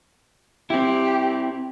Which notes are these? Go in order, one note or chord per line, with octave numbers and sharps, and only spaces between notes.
C4 E4 G4